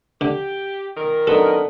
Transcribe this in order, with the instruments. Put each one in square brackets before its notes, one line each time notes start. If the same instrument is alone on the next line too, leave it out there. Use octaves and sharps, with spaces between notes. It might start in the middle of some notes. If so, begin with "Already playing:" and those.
[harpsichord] D3 [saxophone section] G4
[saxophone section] A#2 D#3 A#4
[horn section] F#2 B3 D#4 [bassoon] D3 [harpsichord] A4